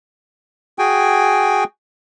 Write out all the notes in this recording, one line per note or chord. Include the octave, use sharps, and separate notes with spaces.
F#4 G#4 G5 G#5